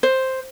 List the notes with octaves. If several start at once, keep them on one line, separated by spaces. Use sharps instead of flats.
C5